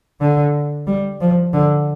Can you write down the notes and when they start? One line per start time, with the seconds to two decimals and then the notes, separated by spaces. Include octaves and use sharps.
0.20 D3
0.87 G3
1.21 F3
1.53 D3